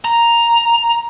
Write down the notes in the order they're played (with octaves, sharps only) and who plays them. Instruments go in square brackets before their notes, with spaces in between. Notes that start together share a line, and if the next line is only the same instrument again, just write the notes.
[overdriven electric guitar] A#5